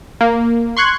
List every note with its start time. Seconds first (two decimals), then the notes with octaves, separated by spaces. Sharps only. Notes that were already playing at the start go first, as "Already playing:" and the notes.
0.21 A#3
0.77 C6 C#6 F#6 G#6